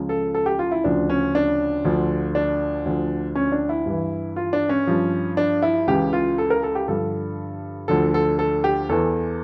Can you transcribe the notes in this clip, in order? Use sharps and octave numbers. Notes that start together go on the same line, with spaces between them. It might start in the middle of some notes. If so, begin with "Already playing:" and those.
Already playing: C#2 C#3 F3
A4
A4
G4
F4
E4
D2 C#3 F3 D4
C#4
D4
D2 D3 F3
D4
D2 D3 F3
C#4
D4
E4
G2 E3
F4
D4
C#4
G2 F3
D4
E4
C#2 C#3 E3 G4
F4
A4
A#4
A4
G4
G2 D3 F3 A4
D2 D3 F3 A4
A4
A4
G4
E2 E3 A4